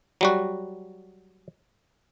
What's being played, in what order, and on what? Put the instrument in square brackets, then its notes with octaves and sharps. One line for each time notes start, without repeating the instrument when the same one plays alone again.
[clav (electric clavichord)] F#3 G3 F#4